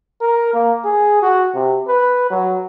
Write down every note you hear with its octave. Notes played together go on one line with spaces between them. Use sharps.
A#4
A#3
G#4
F#4
C3
B4
F#3